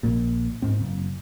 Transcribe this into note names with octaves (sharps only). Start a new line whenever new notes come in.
A#1 A#2
G#2 C4
F#1